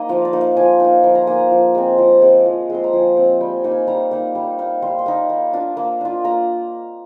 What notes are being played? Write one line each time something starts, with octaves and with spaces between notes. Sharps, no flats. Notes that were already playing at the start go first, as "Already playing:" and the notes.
Already playing: A#3 D#4 D#5
F3 F5
D5
A#3 D#4
F5
F3 G#5
A#3 D#4
F3 C6
A#5
A#3 D#4 G#5
A#5
F3
G#3 C4
F3 A#5
G#3 C4
F3
G#3 C4 C6
A#5
F3 G#5
G#3 C4
G3 G5
G#5
A#3 D#4
G#5
G3 A#5
A#3 D#4
G3
A#3 D#4
G3 C6
C6
A#3 D#4
A#3
D4 F4
A#3
D4 F4
A#3 A#5